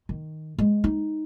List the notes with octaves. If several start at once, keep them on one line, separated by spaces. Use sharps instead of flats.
D#3
G#3
D#4